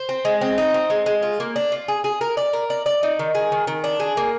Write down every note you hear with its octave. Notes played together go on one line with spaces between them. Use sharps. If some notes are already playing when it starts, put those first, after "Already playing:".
Already playing: C5
C4
G#3
C4
D#4
C4
G#3
G#3
F4
A#3
D4
F4
G#4
G#4
A#4
D5
A#4
D5
D5
D#4
D#3
G#4
D#3
D#3
D4
G#4
A#3